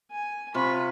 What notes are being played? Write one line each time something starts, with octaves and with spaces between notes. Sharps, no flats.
G#5
C3 F4 B5 C#6